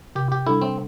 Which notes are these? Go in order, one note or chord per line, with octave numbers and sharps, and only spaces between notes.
C3 G4
G4
G3 D4 E4 A4
C4